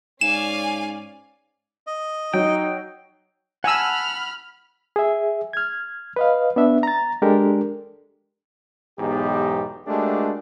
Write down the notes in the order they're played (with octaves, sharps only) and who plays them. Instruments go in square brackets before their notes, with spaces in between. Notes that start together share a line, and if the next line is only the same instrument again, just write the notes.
[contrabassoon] G#2 [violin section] C#4 D5 [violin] F5 G#5 [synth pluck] E7
[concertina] D#5
[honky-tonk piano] F#3 [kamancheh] D#4 [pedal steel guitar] G5
[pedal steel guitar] F#5 A5 [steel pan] G#5 E6 [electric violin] B5 F6
[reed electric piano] G#4 E5
F6 G#6
B4 D#5 F5
B3 D4 E5
A#5 A6
G#3 D4 G4 A4 A#4
[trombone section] B1 E2 G#2 D#4 G4
G#3 A3 D4 F#4 G4 A#4